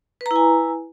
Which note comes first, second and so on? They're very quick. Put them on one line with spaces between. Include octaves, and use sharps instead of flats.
B4 A#5 E4 G#5